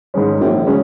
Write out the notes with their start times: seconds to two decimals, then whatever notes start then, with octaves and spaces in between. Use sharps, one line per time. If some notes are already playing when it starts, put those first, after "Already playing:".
0.14 G#2 D#3 G#3 C#4
0.41 A#1 F#2
0.67 C#3 G#3 C#4